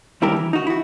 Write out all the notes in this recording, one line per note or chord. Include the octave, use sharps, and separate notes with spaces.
D#2 G3 E4 G4 A#4
E3
D#4 F#4
E4 F#4